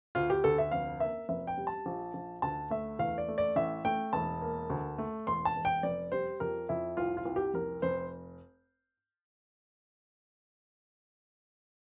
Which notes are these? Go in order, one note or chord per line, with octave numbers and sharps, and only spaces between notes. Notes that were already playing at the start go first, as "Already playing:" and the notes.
D2 F4
G4
D2 A4
E5
F1 F5
A#3 E5
F1 E5
G5
G3
A5
A#1
A#1
D2 A5
A3 E5
E2 F5
D5
A3
D5
A1 E5
A3 G5
E1 A5
A#3
D2
A3
E1 C6
A5
E1
G5
F1 D5
G3 C5
F2 A#4
F2 E4
C2 F4
F4
C2
G4
F1 A#4
F1 C5